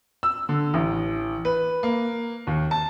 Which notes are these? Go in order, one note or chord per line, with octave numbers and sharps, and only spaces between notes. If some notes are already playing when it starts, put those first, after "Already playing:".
E6
D3
A1
B4
A#3
D#2
A5